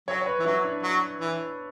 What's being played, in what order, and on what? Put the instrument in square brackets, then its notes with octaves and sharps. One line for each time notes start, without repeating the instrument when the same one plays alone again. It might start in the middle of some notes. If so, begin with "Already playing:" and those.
[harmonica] F#3 [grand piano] C#5
[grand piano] C#5
B4
[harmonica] E3
[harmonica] F#3 [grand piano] E4
[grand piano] D4
[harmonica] F#3
E3